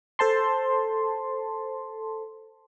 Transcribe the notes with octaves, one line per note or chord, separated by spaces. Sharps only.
A4 C5 A5 C6